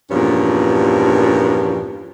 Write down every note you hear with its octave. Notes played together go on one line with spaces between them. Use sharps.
E2 G2 A#2 F3 C#4